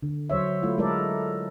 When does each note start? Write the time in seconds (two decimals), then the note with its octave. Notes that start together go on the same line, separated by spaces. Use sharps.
0.03 D3
0.30 F#3 C5 C#5 E5
0.63 A3 E4 F4
0.78 G#3 A3 E4 A4 A#4 D5